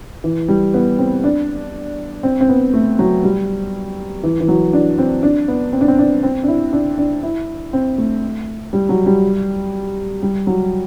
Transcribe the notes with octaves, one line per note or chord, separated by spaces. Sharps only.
E3
G3
B3
C4
D4
C4
C4
B3
A3
F#3
G3
E3
E3
F#3
D4
C4
D4
B3
C4
D4
C4
D4
C4
D4
E4
D4
D4
E4
C4
A3
G3
F#3
G3
G3
F#3